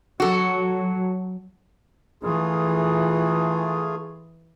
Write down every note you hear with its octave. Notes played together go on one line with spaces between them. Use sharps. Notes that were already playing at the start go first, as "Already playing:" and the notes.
F#3 F#4 A4
E3 A3 F4 G#4